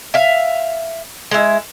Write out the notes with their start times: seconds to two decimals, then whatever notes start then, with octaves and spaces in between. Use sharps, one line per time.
0.14 E5 F5
1.31 G#3 E4